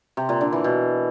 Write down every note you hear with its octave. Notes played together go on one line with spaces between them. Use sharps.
C3
A#2
D3
E3
B2